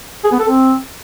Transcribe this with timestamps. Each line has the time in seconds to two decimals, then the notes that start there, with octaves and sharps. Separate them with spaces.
0.24 G#4
0.32 B3
0.40 A4
0.48 C4